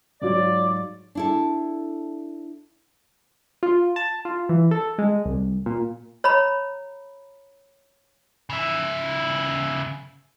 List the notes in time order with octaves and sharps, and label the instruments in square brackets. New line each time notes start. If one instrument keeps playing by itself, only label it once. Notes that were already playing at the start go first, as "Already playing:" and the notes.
[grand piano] G#2 F#3 [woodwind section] F4 C#5 D5
[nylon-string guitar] D4 E4 A4
[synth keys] F4
A5
F4
E3
A4
G#3
C2
A#2
[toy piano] C#5 A#5 B5
[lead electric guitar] C#3 E5